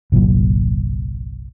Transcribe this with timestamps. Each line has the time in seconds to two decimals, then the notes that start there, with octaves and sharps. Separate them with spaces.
0.12 G1 C2 A#2 F#3